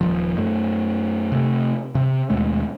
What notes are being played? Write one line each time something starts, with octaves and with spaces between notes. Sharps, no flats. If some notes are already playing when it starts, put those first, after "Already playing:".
D#1 C#2 F3
F#2 A3
C3 A3
C3
D#2 B2 G#3 A3